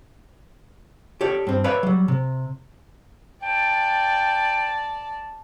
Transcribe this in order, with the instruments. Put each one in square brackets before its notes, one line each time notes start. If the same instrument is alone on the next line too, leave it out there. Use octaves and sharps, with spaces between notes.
[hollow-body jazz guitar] G4 A4 C#5 D5
G2 C4
B4 C#5 D5 E5 F5 B5
F#3 G3
C3
[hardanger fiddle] D5 A5 [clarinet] G5